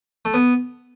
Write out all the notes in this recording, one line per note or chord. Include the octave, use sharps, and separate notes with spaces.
A3
B3